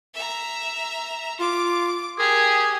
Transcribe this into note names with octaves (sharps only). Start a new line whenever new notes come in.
E5 A#5
F4 D6
G4 G#4 A#4 G#5